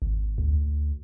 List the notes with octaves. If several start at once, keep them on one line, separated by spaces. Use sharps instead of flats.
G#1
D2